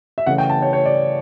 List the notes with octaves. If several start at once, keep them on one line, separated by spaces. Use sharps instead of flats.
E5
C#3 E3 A3 F#5
G5
A5
C#5
C#5
D5